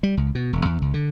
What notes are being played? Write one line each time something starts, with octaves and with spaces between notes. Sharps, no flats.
G3
C#2
B2
E1
E2
C#2
D3